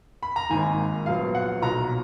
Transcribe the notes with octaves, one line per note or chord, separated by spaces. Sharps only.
B5
A#5
G#1 G#2 D#3 A#3 G#5
A#1 A#2 F#3 B3 F5
F#5
B1 A#2 F#3 A#5